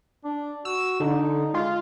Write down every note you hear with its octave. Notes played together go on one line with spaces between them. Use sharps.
D4
F#4 E6
D3 D#4
G#3 F4